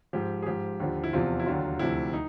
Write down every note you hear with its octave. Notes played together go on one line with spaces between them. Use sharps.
G#2 F3 G4
G#4
G#2 F3 G4
D#2 D3 F3
E4
E2 C3 F3 F4
E4
D#2 D3 F#3 F4
D2 C3 F3 E4
D#4